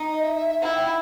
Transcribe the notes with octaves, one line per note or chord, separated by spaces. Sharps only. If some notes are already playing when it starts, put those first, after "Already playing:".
Already playing: D#4
D#5
E5
E5
E5
E4 F#5
G5